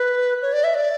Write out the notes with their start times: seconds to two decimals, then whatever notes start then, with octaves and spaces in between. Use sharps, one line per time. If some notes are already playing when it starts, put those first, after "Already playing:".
Already playing: B4
0.42 C#5
0.53 D5
0.64 E5
0.74 D5